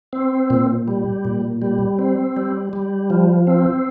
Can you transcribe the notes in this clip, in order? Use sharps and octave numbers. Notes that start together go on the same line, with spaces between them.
C4
A#2
G3
A#2
G3
C4
G3
G3
F3
C4